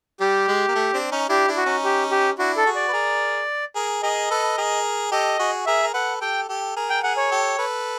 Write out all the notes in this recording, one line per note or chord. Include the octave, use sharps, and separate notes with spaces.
G3 G4
G#3
A#3
A3
C4 D4
C#4 D#4
D4 E4 G4
D4 E4
F#4
C#4 D#4
G4
G4
D4 E4 F#4
A4
F#4 G#4
D5
B4
G#4 A#4
G#4 A#4
G#4 A#4 D#5
A4 B4
G#4 A#4
G4 A4 D#5
F#4 G#4
G#4 A#4 E5
A#4
A4 B4 F#5
G4 A4 G5
G4 A4
G#4 A#4
G5
G#4 A#4 F#5
C#5
G4 A4
A4 B4